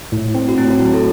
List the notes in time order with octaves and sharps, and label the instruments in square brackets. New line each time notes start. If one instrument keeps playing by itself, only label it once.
[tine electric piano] A2
C4
[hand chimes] F#4
[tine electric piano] A2 [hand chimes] E4
[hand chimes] F#4
[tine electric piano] F#3
[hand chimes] A4